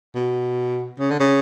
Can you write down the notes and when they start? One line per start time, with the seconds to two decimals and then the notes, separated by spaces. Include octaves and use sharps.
0.15 B2
0.99 C#3
1.10 D3
1.20 C#3